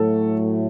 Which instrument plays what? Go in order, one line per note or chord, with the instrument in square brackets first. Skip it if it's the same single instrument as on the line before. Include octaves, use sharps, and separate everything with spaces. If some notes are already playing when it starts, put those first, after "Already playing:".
Already playing: [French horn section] A2 F#3 A3 [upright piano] A4